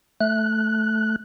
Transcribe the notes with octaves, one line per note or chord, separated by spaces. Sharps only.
A3 F#6